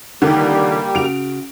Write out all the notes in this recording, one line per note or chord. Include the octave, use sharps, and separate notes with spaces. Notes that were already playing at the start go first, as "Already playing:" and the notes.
C#2 D3 D#3 G3 A#3 G4
C#3 F#4 D7 F7